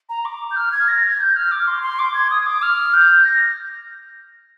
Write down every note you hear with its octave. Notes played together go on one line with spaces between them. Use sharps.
A#5
D6
G6
F6
G#6
A#6
G#6
G6
F6
D6
C6
C6
D6
G#6
D#6
D6
F6
G6
A#6